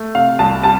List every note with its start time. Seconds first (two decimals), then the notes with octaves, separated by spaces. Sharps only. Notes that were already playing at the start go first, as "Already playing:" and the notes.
Already playing: A3
0.15 C3 F5
0.39 C2 A5
0.63 G3 A5